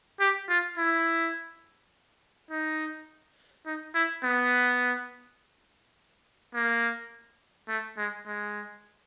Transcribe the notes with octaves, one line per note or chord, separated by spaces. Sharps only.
G4
F4
E4
D#4
D#4
E4
B3
A#3
A3
G#3
G#3